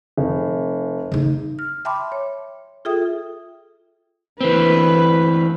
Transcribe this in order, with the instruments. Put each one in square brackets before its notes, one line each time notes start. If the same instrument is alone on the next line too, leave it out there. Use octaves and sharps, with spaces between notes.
[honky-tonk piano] F1
[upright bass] C#3 D#4
[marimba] F6
E5 G5 A5 B5 C6 D6
C#5
F4 G#4 A4 E5 G5 D#6
[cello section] D2 B4 [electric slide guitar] E3 C4